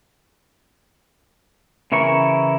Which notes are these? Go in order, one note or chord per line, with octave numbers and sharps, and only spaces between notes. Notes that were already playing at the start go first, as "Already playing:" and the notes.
C#3 E3 E4 A#4 C#6